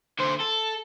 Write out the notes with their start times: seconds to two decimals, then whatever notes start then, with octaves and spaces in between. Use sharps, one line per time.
0.19 D3 C5
0.41 A4